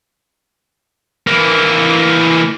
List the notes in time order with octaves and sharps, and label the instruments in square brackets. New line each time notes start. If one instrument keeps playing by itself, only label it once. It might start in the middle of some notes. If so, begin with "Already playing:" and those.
[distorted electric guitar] E3 A#3